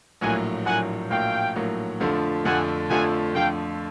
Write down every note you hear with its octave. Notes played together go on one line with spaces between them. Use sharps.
A#1 A2 F#3 A#3 F#5 G#5
A#1 A2 F#3 A#3 F#5 G#5
A#1 A2 F#3 A#3 F5 G5
A#1 A2 F#3 A#3
F2 D3 F3 A3
F2 D3 F3 A3 F#5 G#5
F2 D3 F3 A3 F#5 G#5
F2 D3 F3 A3 F5 G5